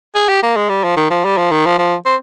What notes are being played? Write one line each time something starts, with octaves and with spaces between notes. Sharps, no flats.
G#4
G4
A#3
G#3
G3
F3
D#3
F3
G3
F3
D#3
F3
F3
C4